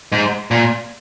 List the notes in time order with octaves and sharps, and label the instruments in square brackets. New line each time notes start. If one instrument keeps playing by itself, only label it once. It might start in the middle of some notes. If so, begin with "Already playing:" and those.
[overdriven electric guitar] G#2
A#2